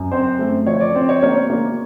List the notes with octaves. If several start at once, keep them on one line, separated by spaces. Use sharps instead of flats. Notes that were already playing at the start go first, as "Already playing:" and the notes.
Already playing: F#2
C4 C5
A3
F3 C#5
D5
C4
C#5
A#3 C#5
A#3